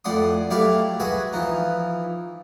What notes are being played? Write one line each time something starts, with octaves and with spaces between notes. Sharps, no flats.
F2 A2 D5 F#5 C6 D#6
F#3 A3 E4 G4 D5 F5
F#4 G#4 B4 E5 G#5
E3 F3 D#4